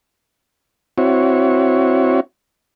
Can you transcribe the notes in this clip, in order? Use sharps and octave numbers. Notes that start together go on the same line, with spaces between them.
C4 E4 F#4 C#5